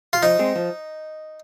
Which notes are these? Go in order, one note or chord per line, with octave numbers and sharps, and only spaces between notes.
F4
F3 D#4
G#3 C4
F3